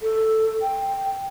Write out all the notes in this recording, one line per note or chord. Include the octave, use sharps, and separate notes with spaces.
A4
G5